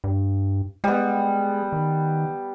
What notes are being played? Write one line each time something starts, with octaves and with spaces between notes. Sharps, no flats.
G2
G3 G#3 B3
D#3